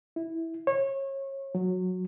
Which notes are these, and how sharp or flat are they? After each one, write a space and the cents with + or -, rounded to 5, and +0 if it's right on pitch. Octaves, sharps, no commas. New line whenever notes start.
E4 -10
C#5 -30
F#3 -15